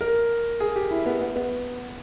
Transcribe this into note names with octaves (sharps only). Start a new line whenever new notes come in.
A#4
G#4
G4
E4
B3
B3
B3